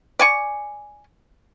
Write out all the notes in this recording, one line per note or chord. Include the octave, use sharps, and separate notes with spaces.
D5 G#5 C#6